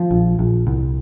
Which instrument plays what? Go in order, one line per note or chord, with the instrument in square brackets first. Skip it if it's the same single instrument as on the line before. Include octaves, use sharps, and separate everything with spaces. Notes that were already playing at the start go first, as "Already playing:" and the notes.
Already playing: [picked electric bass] F3
A#1
A#1
C2